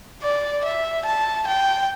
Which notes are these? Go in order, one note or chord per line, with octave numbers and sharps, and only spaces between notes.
D5
E5
A5
G5